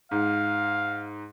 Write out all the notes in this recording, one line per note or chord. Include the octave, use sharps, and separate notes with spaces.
G#2 F5